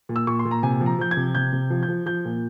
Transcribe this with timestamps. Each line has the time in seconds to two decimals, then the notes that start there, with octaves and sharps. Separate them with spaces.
0.09 A#2
0.16 E6
0.27 A#2 C#6
0.39 C6
0.45 A#2
0.51 A#5
0.63 C3 G#5
0.81 F3
0.86 A#5
0.99 F3 G6
1.11 G#6
1.17 C3
1.35 C3 G6
1.53 C3
1.70 F3
1.83 G6
1.88 F3
2.06 F3 G6
2.25 A#2